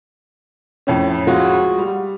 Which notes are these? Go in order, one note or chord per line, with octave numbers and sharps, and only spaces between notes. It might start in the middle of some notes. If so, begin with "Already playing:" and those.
F2 A2 C#4
G#3 F4 F#4
G3